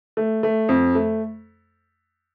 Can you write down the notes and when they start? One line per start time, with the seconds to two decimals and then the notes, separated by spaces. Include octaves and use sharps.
0.17 A3
0.43 A3
0.69 F2
0.95 A3